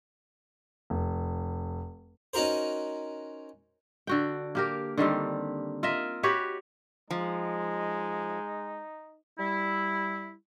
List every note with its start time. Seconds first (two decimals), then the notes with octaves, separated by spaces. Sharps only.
0.90 F1
2.34 C#4 D#4 F#4 A#4 C5
4.07 D3 F#4 G5
4.55 A#3 G4 A#4
4.98 D3 D#3 G3 C4
5.83 F4 A#4 D#5 E5
6.23 F#4 G4 B4 C#5
7.11 F3 G#3 D#4
9.38 G3 E4